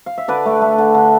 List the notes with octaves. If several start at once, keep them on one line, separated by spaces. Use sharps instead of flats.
F5
E5
D3 B4 D5
A3
A3
D3
D3